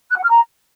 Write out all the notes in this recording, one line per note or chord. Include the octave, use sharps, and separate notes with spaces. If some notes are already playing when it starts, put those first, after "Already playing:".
F#6
F#5
F6
A#5